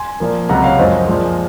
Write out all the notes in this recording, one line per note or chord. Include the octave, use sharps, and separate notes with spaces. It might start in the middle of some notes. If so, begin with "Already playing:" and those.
Already playing: G#5 C6
A#2 F3 A#3
C#2 C3 F#3 F#5 A#5
C#5 F5
F#2 F3 G#3 C5 D#5
A#2 F3 G#3